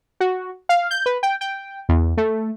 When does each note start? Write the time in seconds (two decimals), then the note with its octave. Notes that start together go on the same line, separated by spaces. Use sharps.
0.20 F#4
0.69 F5
0.91 G6
1.06 B4
1.23 G5
1.41 G5
1.89 E2
2.17 A3